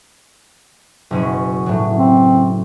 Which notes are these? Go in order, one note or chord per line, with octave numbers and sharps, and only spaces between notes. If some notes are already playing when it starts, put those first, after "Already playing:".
F#1 B2 C#4
A2 F#3
C4